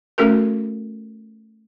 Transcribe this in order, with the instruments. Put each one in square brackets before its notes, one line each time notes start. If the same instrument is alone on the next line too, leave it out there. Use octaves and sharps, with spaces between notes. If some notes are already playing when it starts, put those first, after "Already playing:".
[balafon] A3 C#4 F#4 A4 A#4